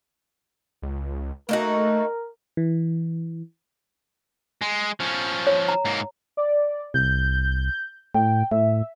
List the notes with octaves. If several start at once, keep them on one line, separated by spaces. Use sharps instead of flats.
C#2
A3 A#3 D#4 F#4 A#4
E3
G#3
F3 C#4
C#5
A#5
G#2 A#3
D5
C2 G6
A2 G5
A2 E5